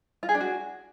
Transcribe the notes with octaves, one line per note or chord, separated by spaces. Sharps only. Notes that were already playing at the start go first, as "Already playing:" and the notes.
F4
G#4
D4
F#4